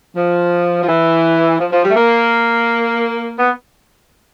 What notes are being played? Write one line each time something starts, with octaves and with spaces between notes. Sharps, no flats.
F3
F3
E3
F3
F3
G3
A3
A#3
B3